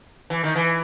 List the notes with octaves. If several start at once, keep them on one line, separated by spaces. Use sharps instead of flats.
E3
D#3
E3